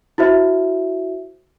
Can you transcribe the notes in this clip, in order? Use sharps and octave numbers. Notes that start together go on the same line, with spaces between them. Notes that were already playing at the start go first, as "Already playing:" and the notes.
E4 F#4 C5 E5